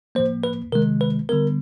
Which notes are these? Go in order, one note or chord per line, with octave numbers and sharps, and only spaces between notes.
A2 F3 A#3 C5
B4
C3 D#3 G#3 A#4
B4
D3 G3 B3 A#4